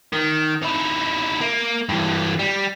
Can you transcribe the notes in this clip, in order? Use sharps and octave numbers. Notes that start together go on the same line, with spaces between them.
D#3
D#4 E4
A#3
G2 E3
G3